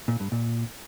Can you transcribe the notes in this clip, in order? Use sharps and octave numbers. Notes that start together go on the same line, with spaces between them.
A#2
G2
A#2